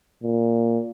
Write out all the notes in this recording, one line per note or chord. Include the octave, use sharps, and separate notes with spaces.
A#2